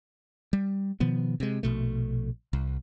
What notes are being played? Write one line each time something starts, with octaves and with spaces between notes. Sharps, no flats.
G3
B2 D#3 F3 B3
C3 G#3
A#1 B2 A3
C2